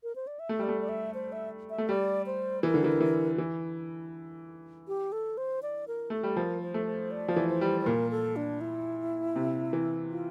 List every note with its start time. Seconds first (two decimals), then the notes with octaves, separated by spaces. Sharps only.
0.03 A#4
0.16 C5
0.27 D5
0.39 E5
0.49 A3
0.59 G3 D5
0.69 A3
0.81 D5
0.89 E5
1.14 C5
1.32 E5
1.70 E5
1.78 A3
1.89 G3 D5
2.26 C5
2.63 E3 A#4
2.74 D3
2.84 E3
3.00 E3
3.38 E3
4.88 G4
5.12 A4
5.37 C5
5.63 D5
5.88 A#4
6.10 A3 A4
6.23 G3
6.36 F3 A#4
6.62 C5
6.74 A3
6.86 C5
7.11 D5
7.28 F3
7.36 E3
7.49 C5
7.61 G3
7.81 C5
7.86 A#2 A#4
8.11 A4
8.36 D4
8.61 E4
9.36 C3
9.73 E3
10.10 F4